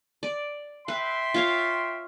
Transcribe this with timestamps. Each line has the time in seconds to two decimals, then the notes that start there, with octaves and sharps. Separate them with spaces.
0.23 D5
0.88 B4 E5 G5 C6
1.34 F4 C#5 F5